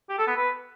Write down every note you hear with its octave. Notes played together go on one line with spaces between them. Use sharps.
G4
A4
B3
B4